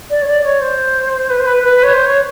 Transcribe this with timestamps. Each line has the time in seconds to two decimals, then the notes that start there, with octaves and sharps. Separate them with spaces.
0.10 D5
0.22 C#5
0.28 D5
0.44 C#5
0.61 C5
1.30 B4
1.39 C5
1.46 B4
1.63 B4
1.83 C#5
1.93 C5
2.06 C#5